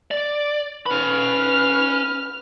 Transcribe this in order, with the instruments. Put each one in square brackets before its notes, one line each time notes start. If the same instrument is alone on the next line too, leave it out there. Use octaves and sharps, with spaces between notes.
[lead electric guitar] D5
[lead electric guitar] C#4 B5 [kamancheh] B4 F6